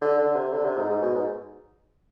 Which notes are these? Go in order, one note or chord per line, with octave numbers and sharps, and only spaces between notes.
D3
D3
C3
D3
C3
G#2
G#2
B2
G#2